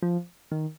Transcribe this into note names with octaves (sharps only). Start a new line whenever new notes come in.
F3
D#3